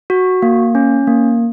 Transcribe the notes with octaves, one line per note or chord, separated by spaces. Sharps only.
F#4
A#3
C#4
A#3